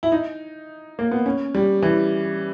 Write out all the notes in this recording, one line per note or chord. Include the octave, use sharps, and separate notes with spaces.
E4
D#4
A#3
B3
C#4
G3
E3